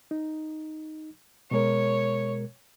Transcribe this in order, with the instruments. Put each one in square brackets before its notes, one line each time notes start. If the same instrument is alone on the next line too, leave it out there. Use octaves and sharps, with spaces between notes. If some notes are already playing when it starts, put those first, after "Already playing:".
[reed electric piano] D#4
[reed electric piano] B2 G#3 A#4 [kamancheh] C#5